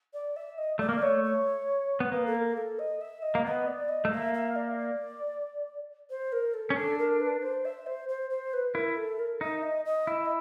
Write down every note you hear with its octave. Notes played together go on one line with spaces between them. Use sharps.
D5
E5
D#5
A3 D5
A#3
A3 C#5
C#5
B3
A#3 B4
A4
A#4
A4
D#5
E5
D#5
A#3
B3 D#5
D5
D#5
A3
A#3 E5
E5
D5
C5
A#4
A4
C#4
D4 A4
A#4
B4
C5
E5
C5
C5
C5
B4
E4 A#4
A4
A#4
D#4 E5
D#5
D#5
E4 E5
D#5